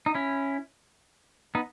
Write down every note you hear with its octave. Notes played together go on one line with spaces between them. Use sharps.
D#4
C#4 E4
B3 D#4